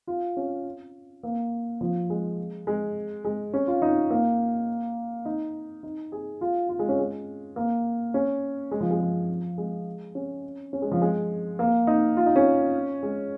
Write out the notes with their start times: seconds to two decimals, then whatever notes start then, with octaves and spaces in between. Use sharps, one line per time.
0.07 F4
0.37 C#4
1.23 A#3
1.81 F3
2.10 G#3
2.67 G#3
3.25 G#3
3.54 C#4
3.67 F4
3.82 D#4
4.10 A#3
5.25 D#4
5.83 D#4
6.12 G#4
6.41 F4
6.69 F4
6.79 G#3
6.89 C#4
6.99 G#3
7.56 A#3
8.14 C#4
8.71 G#3
8.80 F3
8.91 G#3
9.00 F3
9.58 G#3
10.15 C#4
10.73 C#4
10.82 G#3
10.91 F3
11.02 G#3
11.59 A#3
11.87 D#4
12.17 F4
12.26 D#4
12.36 C#4
13.03 G#3